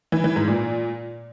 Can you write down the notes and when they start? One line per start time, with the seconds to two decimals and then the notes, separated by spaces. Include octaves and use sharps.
0.12 E3
0.24 E3
0.36 G#2
0.48 A#2